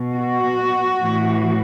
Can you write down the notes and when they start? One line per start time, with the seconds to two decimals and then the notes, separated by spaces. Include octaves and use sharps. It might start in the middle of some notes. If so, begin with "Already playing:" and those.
Already playing: B2
0.14 F#4
1.00 A2 E3